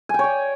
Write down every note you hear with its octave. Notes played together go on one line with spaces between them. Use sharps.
C#5 D5 G5 G#5